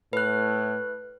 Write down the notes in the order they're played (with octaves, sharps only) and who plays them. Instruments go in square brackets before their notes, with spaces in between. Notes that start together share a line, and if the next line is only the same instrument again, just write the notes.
[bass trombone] A2 [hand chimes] B4 F#6